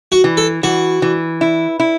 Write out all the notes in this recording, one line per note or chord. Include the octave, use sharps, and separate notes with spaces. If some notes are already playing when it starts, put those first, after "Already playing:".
F#4
E3
A4
E3 F#4
E3
E4
E4